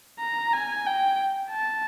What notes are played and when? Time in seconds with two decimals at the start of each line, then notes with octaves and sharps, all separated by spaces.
0.21 A#5
0.53 G#5
0.86 G5
1.50 A5